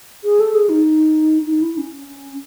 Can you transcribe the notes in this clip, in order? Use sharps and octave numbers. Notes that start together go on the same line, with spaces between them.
G#4
A4
G#4
D#4
D#4
E4
C#4